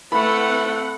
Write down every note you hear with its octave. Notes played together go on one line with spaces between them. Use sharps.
A3 C4 E4 B4 F#5 B5